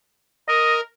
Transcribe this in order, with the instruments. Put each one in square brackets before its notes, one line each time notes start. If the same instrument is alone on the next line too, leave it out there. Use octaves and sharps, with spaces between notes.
[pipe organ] A#4 [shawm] D#5